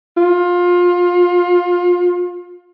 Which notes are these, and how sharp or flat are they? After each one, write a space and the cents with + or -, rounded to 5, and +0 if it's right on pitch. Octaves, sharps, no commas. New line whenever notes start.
F4 +25